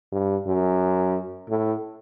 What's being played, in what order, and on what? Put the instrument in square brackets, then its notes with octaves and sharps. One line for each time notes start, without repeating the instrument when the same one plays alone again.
[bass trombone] G2
F#2
A2